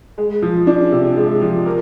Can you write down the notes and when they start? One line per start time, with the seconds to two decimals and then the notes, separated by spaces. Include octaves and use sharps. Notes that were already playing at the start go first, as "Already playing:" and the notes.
0.18 G#3
0.42 F3
0.67 D4
0.92 C3
1.17 G#3
1.41 F3
1.66 A#4